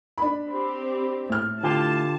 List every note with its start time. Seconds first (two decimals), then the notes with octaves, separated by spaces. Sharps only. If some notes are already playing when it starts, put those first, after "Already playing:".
0.18 D4 B5
0.49 C4 G4
1.29 A2 F6
1.63 D3 F4 G4 A5